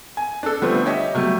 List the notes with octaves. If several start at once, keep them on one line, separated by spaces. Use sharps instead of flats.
G#5
D4 A4
D3 F3 G3 A3 B3 C4
G4 C#5 D#5 E5 G5
F#3 G3 A3